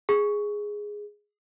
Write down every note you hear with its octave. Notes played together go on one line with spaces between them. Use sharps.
G#4